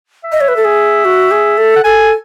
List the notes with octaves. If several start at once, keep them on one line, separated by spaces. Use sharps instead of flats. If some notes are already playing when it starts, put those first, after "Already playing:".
E5
D#5
C#5
B4
A4
G#4
F#4
G#4
A4
F#5
A4 G#5